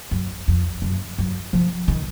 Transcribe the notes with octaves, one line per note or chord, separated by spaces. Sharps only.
F#2
F2
F#2
F#2
F3
D#3